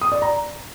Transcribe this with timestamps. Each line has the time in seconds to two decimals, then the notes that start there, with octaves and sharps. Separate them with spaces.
0.01 D#6
0.12 D5
0.22 A#5